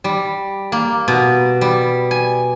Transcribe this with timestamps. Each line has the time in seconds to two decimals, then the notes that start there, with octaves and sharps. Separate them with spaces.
0.04 G3
0.72 A#3
1.08 B2
1.61 G3
2.11 G#5